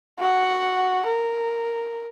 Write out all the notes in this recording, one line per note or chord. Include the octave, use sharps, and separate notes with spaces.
F#4 F#5
A#4